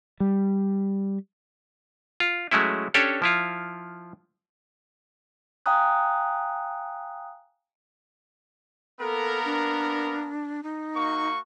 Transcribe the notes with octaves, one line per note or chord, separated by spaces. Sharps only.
G3
F4
F#3 G#3 A3 C#4 E4
C#4 D4 G4 A4 C#5
F3 E4 F4
F5 G5 G#5 A#5 D#6 F#6
A#3 B3 A4 A#4
D4
D#4
A#3 F#4 C#6